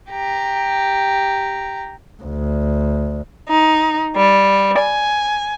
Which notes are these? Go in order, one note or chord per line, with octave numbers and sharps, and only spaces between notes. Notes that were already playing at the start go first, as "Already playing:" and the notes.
G4 A#5
D2
D#4
G3
G#5